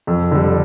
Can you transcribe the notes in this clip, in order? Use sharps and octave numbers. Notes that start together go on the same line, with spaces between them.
F2
D3 G3